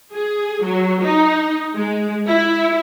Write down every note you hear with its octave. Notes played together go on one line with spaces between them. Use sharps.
G#4
F#3
D#4
G#3
E4